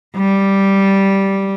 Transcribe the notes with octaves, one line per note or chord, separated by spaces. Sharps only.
G3